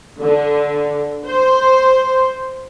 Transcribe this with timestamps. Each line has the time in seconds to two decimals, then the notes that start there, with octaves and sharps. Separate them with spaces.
0.20 D3
1.25 C5